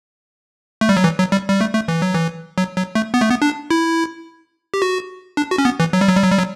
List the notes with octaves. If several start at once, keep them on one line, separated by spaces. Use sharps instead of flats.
A3
G3
F#3
E3
F#3
G3
G3
A3
A3
E3
F#3
E3
F#3
F#3
A3
B3
A3
B3
D4
E4
G4
F#4
D4
F#4
C#4
B3
E3
F#3
G3
F#3
G3
F#3
G3
F#3